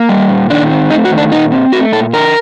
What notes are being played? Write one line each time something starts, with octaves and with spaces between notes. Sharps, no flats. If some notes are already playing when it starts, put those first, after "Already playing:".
Already playing: A#3
G3
A#2
D#3 D4
C4
A3 D#4
F#4
D#3
D4
A#2 D#4
C4
A3 F#4
A#2 A4
D3 A#4